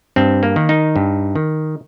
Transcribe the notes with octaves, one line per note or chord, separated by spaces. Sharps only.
G2 C4
A#3
D#3
D#4
G2
D#3